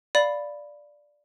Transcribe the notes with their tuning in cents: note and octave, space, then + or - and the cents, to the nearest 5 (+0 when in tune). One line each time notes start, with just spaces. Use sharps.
D5 +0 F5 +0 B5 +0